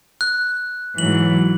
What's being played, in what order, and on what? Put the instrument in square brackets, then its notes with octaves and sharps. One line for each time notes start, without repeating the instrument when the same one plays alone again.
[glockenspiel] F#6
[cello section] G#2 E3 F#3 [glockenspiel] F#7